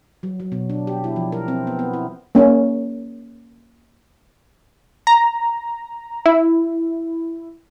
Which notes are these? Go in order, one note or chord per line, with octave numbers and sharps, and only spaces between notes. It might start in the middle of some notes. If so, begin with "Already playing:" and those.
F#3
F#3
B2
D4
G4
E4
F3
A#4
C4
B3
B3
E4
A#3 C#4
A#5
E4